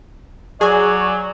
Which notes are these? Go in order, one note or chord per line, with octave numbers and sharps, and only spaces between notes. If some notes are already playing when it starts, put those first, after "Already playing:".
F#3 G#4 D5 G#5 C#6